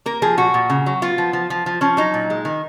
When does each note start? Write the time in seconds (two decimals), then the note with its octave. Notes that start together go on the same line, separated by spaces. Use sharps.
0.06 A#3 A#4
0.22 F3 G#4
0.37 A#2 F#4
0.54 A#2
0.70 C#3
0.86 F#3
1.02 B3 F4
1.18 F3
1.33 F3
1.50 F3
1.66 F3
1.81 F3 C#4
1.97 F#3 D#4
2.14 A#2
2.30 G#3
2.45 D#3